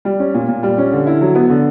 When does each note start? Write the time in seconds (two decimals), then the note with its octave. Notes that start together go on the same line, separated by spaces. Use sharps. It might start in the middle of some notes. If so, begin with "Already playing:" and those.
0.05 G3
0.20 C#4
0.34 A#2
0.48 A#2
0.63 G3
0.78 C#4
0.92 D3
1.07 E4
1.21 F#3
1.35 B3
1.50 D3